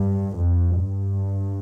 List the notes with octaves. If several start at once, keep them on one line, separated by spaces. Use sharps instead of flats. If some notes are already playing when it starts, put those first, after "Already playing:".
Already playing: G2
F2
G2